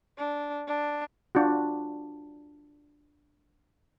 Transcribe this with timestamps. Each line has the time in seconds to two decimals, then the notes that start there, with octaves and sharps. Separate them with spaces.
0.18 D4
0.67 D4
1.35 D4 F4 F#4